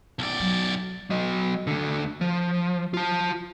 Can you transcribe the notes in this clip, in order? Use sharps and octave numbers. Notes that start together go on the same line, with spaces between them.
B1 D5
F#3
F#3 D#5
D2 D3
F3
F4 A5